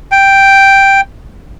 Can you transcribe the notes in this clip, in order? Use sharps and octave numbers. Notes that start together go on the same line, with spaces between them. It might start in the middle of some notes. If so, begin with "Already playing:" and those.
G5